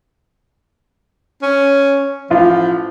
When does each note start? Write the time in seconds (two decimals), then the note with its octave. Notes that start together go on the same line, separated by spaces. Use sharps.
1.42 C#4
2.30 A1 F3 F4